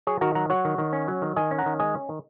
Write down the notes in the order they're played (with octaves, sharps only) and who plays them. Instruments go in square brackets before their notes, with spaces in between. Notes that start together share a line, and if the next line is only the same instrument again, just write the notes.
[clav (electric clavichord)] F#3 G#4 C#5
D#3 F#4 A#4
F#3 F#5 A#5
F#3 C#5 F#5
D#3
D#3
C#4
F#3
D#3
D#3 D#5 G#5
C#4
F#5 A#5
D#3
G#3 D#5 G#5
C#4
D#3